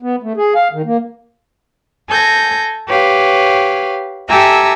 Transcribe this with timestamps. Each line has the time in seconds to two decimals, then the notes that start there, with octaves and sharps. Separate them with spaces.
0.03 B3
0.23 A3
0.37 G#4
0.55 F5
0.73 D#3
0.86 A#3
2.08 A4 G#5 G6 A#6
2.87 G4 B4 C#5 F5
4.29 G4 A4 E5 G#5 A#5 E6